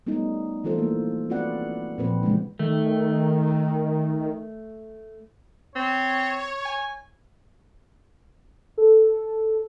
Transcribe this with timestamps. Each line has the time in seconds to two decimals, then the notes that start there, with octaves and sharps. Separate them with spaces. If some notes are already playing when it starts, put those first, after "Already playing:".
0.07 G3 A3 B3 C#4 D#4
0.64 E3 A3 F4 A4 C5
0.78 A3 A#3
1.30 C4 F4 F#4 B4 D5 F#5
1.98 A#2 F3 C4 B4 C5
2.22 C#3 E3 F3 G#3 D4
2.59 D#3 A3
5.75 C4 C#5
6.65 G#5
8.78 A4